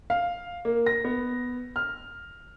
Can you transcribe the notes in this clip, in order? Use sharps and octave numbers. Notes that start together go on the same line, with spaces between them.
F5
A#3
A#6
B3
F6